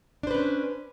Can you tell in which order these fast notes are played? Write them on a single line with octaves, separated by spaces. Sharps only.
D4 C5 B4 C#4